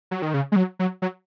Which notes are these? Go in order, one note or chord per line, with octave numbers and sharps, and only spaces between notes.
F#3
D#3
C#3
G#3
F#3
F#3
F#3